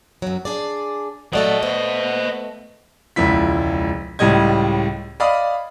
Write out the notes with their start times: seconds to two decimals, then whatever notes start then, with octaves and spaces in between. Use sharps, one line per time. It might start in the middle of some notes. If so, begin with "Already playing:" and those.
0.22 F#2 F#3
0.45 D4 G#4 D5
1.33 F#3 A3 A4 D5 D#5 F#5
1.63 A3 B3 C5
3.16 E1 C#2 F3 E4 B6
4.19 C#2 A2 G3 D#5 G#6
5.20 D5 D#5 F5 B5 D#6